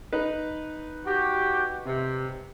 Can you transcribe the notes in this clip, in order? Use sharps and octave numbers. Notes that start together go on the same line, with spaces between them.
D#4 B4
F#4 G4
C3